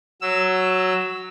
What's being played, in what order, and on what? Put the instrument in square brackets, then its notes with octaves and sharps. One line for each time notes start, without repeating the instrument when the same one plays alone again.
[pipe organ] F#3 E6